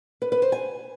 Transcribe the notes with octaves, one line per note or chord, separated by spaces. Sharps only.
B4
B4
C5
G#5